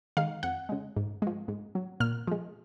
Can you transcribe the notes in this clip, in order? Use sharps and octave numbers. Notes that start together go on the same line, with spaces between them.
D#3 G#3 F5
F2 F#5
C#3 G#3
G#2
F3 G#3
G#2
F#3
A#2 F6
F3 G#3